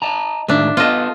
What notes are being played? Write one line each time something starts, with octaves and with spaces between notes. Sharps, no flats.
D#5 A5 A#5
A2 D#3 G#3 D4 E5
B3 F4 A4 D#5